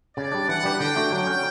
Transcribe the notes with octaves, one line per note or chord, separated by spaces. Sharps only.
C#3 D5
G3 D4
E3 F#5
G3 D4 G4 B4
D3 G5
A3 D4 F#4
F#3 G5
C#4 F#4